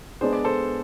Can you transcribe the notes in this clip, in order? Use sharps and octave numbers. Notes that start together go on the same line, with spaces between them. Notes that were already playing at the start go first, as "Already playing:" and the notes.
G#3 B3 D4 G#4 C5
D5
A4 C5